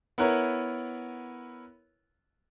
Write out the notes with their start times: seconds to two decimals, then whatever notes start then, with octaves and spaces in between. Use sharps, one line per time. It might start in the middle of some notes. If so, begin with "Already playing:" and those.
0.18 B3 E4 A#4 B4 C#5